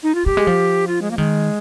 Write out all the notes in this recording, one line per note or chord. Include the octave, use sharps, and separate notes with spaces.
D#4
F4
G3 G4
G#3
F3
F4
G#3
A#3
D#3 G#3